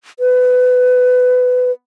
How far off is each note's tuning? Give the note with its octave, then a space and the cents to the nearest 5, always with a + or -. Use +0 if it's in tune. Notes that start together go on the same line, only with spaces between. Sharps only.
B4 +20